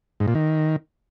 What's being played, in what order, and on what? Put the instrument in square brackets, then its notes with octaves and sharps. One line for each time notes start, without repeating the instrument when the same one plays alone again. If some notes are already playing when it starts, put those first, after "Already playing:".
[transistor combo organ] G#2
A#2
D#3